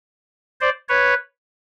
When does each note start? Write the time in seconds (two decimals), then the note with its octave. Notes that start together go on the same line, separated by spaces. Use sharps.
0.61 C5 D5
0.89 B4 C#5